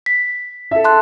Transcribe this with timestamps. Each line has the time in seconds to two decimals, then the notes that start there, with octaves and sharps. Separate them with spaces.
0.06 B6
0.71 A4 E5
0.84 A5 C6 F#6